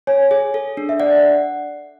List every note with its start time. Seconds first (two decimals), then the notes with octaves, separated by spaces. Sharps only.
0.07 C#5 G#5
0.31 G#4
0.54 A4
0.77 D4
0.89 E5
1.00 D5 F#5